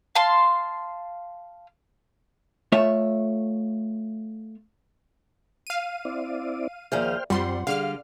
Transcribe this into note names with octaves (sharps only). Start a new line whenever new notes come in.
F5 A5 C6
A3 F4 C#5 E5
F5 D#7
C4 E4 D5
D#2 F3 G#4 C5 D5 E5 G5 F6
F#2 G3 C4 F4 F#5 C6
D3 G3 G#4 F5 F#5 F6